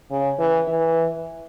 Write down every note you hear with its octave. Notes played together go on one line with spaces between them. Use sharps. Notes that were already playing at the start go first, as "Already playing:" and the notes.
C#3
E3
E3